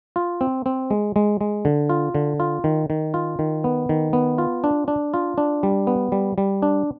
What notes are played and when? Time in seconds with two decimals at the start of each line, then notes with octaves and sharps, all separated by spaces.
0.16 F4
0.41 C4
0.66 C4
0.91 G#3
1.16 G#3
1.41 G#3
1.65 D3
1.89 F4
2.15 D3
2.40 F4
2.64 D#3
2.90 D#3
3.14 F4
3.39 D#3
3.64 B3
3.89 D#3
4.13 B3
4.38 F4
4.64 D4
4.88 D4
5.14 F4
5.38 D4
5.63 G3
5.87 B3
6.12 G3
6.38 G3
6.62 D4